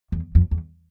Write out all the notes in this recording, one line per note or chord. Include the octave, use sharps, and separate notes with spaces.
E2
F2
E2